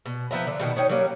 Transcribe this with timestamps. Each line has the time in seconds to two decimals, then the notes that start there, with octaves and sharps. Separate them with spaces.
0.06 B2
0.31 F3 B3 E5 A#5
0.47 D3
0.60 B2 D#3 B3
0.76 C#4 D#4 C#5 G5
0.89 F#3 G3 A#3 C#4